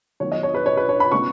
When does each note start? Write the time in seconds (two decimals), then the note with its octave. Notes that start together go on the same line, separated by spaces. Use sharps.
0.20 D#3 F#3 B3 C#5
0.32 D#5
0.43 C#5
0.54 B4
0.66 C#5
0.77 B4
0.89 C#5
1.00 B5
1.11 C#3 G#3 B3 C#6